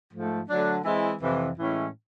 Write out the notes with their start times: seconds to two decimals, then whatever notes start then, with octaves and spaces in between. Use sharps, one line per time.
0.12 G#2 F3 A3
0.49 D3 F#3 A3 D4
0.84 E3 G#3 C4 E4
1.21 F2 C3 E3
1.58 A2 E3 G#3 C#4 E4